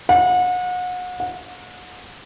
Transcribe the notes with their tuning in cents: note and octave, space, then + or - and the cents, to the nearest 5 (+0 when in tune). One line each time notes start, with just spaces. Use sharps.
F#5 -35
F#5 -30